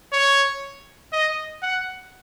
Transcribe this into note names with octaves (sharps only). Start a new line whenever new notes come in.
C#5
D#5
F#5